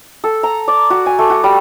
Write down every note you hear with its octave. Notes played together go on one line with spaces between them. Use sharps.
A4
A#5
D5
F#4
G#5
A3
F#4
G3